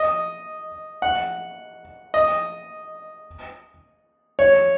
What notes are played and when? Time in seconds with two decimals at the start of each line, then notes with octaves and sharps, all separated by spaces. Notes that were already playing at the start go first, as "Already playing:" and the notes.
Already playing: D#5
1.02 F#5
2.14 D#5
4.39 C#5